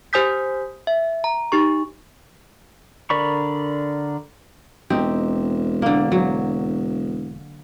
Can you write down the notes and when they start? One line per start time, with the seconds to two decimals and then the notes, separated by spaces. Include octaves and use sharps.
0.13 G4 C5 G#5 D#6 G6 B6
0.87 E5
1.24 A#5
1.52 D#4 G4 C#6
3.10 D3 A#4 D5 B5 C#6
4.90 E1 C4 D#4 G4
5.82 D3 A#3
6.12 F#3